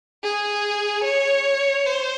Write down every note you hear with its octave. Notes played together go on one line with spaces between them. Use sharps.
G#4
C#5
C5